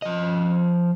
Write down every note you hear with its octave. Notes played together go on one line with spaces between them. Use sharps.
F3 D#5